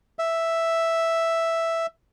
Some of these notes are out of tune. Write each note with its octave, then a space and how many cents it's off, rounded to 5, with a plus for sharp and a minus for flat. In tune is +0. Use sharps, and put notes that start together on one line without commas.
E5 +0